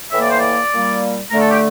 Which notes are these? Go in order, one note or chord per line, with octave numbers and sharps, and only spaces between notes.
A2 E3 A#3 E5
D5
C5
D5
A#2 G3 A#3
D3 A3 A#4
A4
G4